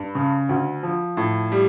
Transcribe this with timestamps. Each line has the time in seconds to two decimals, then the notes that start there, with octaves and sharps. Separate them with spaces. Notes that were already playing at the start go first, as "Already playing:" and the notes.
Already playing: G2
0.15 C#3
0.49 D2
0.83 F3
1.17 A2
1.52 G3